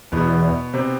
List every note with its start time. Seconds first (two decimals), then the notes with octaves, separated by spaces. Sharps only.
0.12 E2 B2 B3
0.73 C3 C4